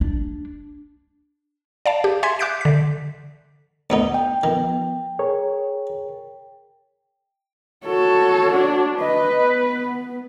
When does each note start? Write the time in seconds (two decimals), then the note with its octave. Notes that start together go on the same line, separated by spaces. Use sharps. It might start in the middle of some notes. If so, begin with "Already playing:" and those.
0.01 D4
1.86 D5 F5 A5
2.04 G4
2.23 E5 G#5 C6 G#6 B6
2.39 E5 D6 F#6 G6 B6 D7
2.61 D3 B6
3.90 D2 B3 D#4
4.14 G5
4.44 D#3 F3 B3
5.19 G#4 A#4 C#5
7.86 F#4 A4 C#5
8.52 D4
9.00 B4 D#5
9.32 B3